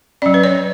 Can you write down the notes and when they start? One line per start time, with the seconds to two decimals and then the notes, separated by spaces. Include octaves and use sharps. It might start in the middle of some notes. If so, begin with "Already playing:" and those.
0.22 F#3 C#4 D5
0.34 B4
0.44 C#5